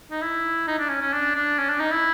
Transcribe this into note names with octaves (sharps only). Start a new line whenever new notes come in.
D#4
E4
D#4
D4
C#4
C#4
D4
D4
C#4
D4
D#4
E4